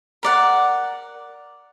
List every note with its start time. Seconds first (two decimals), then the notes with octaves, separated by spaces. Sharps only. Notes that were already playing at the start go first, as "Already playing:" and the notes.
0.23 A#4 D5 F#5